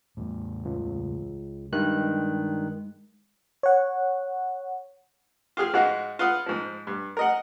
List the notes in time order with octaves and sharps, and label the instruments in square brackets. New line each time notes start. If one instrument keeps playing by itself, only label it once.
[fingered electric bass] E2 A2
[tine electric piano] C#2
[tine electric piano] G2 D#3 F#6 [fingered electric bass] G#3
[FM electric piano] C#5 F#5
[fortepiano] F4 G4 G#4 F6
G#2 G#3 F#4 F5
F4 B4 F#5 D#6
G#2 F3
G2
A#4 D#5 F#5